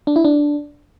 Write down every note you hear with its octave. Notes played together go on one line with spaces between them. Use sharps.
D4
E4
D4